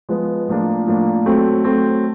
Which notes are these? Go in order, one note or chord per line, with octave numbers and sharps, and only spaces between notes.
F3 G#3 B3
A2 F3 A#3 D4
A2 F3 A#3 D4
F#3 A3 C4
F#3 A3 C4